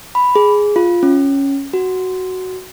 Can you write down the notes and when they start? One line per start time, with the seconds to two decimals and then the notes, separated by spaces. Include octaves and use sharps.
0.15 B5
0.36 G#4
0.76 F4
1.03 C#4
1.73 F#4